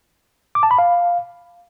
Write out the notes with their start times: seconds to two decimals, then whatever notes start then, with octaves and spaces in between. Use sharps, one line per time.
0.55 D6
0.63 A5
0.71 B5
0.78 F5